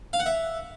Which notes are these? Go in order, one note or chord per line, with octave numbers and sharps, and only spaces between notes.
F5
F#5
E5